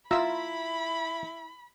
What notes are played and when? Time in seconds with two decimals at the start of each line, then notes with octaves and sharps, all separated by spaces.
0.11 E4 F4 E5 A#5 B5 E6